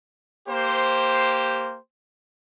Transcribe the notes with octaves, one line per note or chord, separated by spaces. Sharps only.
A#3 G4 C5